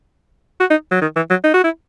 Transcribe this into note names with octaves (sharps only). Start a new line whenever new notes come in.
F#4
D#4
F#3
D#3
E3
F#3
D#4
F#4
E4